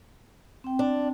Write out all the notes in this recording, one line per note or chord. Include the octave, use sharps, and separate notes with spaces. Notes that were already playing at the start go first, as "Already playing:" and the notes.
C4 G5
D4